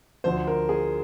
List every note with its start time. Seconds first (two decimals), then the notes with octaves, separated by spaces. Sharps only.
0.24 D2 D3 F3 C5
0.47 A#4
0.69 G#4